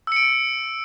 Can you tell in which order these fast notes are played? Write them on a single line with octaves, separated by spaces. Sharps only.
E6 C#7 D7